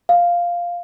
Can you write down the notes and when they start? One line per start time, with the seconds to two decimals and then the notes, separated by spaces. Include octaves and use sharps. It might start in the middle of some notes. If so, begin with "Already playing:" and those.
0.09 F5